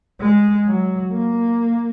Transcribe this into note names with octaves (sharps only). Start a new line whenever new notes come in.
G#3
F#3
A#3